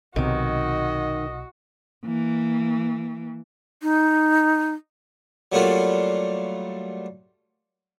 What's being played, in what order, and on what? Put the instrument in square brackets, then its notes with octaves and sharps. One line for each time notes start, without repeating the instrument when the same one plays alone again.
[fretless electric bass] B1 C3 [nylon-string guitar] D#3 [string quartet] F#4 [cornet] D#5
[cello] E3 A#3
[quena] D#4
[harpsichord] F#3 G3 A3 A#3 F4 F#4